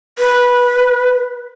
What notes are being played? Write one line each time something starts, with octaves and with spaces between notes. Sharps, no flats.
B4